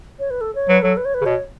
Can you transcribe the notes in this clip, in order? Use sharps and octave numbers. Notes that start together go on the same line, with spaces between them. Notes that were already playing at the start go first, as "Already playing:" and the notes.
C#5
B4
A4
C#5
F#3 B4
F#3 A4
B4
C#5
B4
C#3
B2 C#5